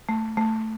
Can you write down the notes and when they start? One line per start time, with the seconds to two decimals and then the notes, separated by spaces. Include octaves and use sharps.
0.09 A3
0.37 A3